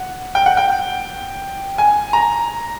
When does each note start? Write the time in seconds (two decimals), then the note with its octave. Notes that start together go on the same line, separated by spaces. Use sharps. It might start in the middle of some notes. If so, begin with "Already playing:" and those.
Already playing: F#5
0.35 G5
0.46 F#5
0.57 G5
1.78 G#5
2.13 A#5